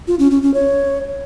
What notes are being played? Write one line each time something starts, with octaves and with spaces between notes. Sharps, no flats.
F4
C#4
C#4
C#4
C#5